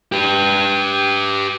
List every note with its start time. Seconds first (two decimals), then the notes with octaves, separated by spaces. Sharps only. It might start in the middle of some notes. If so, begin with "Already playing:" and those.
0.12 G4 B4